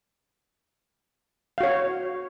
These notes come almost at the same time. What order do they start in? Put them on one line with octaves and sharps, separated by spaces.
F5 F#4 C#5